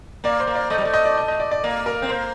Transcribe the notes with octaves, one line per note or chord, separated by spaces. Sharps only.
A#3 D5
C5
A#3
D5
A3 D#5
G3
A3 D5
D#5
D5
D#5
D#5
D5
D5
A#3 D5
A#4
C4
A#3 C5